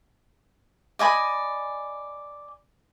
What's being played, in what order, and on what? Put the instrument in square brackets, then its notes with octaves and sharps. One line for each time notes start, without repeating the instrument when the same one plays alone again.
[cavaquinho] D5 D#5 G#5 B5